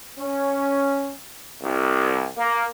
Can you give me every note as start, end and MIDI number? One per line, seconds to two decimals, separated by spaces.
0.19 1.14 61
1.63 2.28 36
2.38 2.65 58